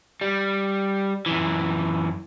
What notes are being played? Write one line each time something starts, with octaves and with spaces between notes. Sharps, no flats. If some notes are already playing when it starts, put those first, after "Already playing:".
G3
F#2 E3